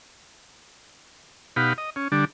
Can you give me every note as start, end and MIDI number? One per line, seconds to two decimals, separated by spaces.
1.56 1.73 47
1.56 1.73 63
1.56 1.73 67
1.56 1.73 77
1.56 1.73 78
1.56 1.73 83
1.78 1.90 75
1.96 2.08 61
2.12 2.25 50
2.12 2.25 55
2.12 2.25 62